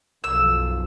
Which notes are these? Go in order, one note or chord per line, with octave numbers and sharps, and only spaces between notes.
B1 F#2 F3 E6